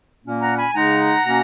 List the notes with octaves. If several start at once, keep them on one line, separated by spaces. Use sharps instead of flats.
A#2 A#3 C#4
F#5 A#5
G#5 B5
C#3 G#3 D#4 F#5 A#5
B2 A#3 C#4